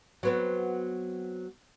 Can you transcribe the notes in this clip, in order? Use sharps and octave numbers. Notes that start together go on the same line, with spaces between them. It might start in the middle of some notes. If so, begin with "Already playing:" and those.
F#3 B3 C4